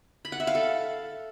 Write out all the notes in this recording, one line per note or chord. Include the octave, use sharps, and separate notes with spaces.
B5
F#5
E5
F5
A4